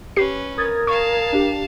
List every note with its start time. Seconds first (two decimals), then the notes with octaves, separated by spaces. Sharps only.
0.16 C#4 G4 B4 C7
0.57 A#4 D#6 G#6 A6
0.87 F5 A5 C#6
1.32 D4 G4